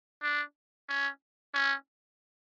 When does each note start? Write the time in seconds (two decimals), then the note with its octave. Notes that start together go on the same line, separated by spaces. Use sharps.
0.22 D4
0.88 C#4
1.54 C#4